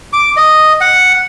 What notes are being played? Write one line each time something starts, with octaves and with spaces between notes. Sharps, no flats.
D6
D#5
F#5